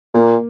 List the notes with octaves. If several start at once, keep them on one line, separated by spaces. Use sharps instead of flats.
A#2 A#3